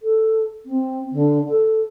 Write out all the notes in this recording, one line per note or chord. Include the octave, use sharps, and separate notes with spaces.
A4
C4
D3
A4